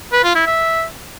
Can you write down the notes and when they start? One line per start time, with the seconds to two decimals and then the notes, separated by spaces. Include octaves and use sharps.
0.13 B4
0.24 F4
0.35 E4
0.46 E5